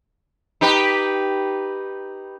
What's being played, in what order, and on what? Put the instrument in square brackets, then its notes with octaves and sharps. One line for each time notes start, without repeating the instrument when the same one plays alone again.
[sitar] D#4 G4 B4